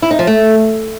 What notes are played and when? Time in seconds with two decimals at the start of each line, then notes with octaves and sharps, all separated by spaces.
0.02 E4
0.11 D#4
0.19 F3
0.27 A3